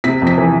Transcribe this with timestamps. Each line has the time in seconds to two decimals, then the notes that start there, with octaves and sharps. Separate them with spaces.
0.04 C3 B6
0.22 F2 B6
0.38 E3